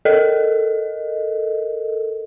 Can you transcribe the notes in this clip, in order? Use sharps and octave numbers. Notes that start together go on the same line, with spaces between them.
A4 A#4 D#5